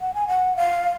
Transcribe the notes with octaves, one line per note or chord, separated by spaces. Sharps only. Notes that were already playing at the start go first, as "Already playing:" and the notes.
F#5
G#5
F#5
F5